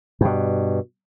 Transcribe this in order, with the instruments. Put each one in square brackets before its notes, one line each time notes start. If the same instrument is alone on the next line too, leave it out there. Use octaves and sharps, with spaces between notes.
[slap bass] G2 B2